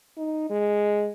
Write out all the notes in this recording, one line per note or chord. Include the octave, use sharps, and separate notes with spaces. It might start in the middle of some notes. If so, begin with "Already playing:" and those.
D#4
G#3